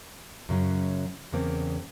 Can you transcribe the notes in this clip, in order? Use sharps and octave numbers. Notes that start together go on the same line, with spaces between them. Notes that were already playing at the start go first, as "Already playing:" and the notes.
F#2 C#3 F#3
E2 C#3 A#3 C4